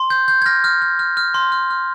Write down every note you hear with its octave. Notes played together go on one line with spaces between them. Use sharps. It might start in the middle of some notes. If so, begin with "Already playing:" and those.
Already playing: C6
G6
G6
G#6
F6 A#6
F6
F6
F6
F6
C6
F6
F6